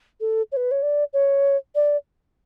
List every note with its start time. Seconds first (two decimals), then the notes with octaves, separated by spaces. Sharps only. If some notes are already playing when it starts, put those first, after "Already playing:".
0.21 A4
0.52 C#5
0.57 B4
0.71 C#5
0.82 D5
1.13 C#5
1.75 D5